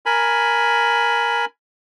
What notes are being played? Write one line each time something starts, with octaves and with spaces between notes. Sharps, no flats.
A#4 G#5 B5